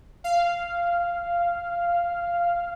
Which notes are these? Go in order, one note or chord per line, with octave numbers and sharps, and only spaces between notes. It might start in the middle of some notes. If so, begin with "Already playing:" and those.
F5